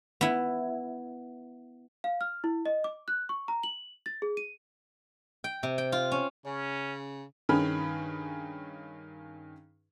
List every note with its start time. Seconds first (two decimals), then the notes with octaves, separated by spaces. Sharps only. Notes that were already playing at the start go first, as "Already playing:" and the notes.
0.21 B3 E4
2.04 F5
2.21 F6
2.44 E4
2.66 D#5
2.84 D6
3.08 F#6
3.29 C#6
3.48 A#5
3.63 F#7
4.06 A6
4.22 G#4
4.37 D#7
5.44 G5
5.63 C3
5.78 G5
5.92 F4
6.12 C#4
6.46 C#3 C#4
7.49 G2 D#3 C#4 G#4 B5 F6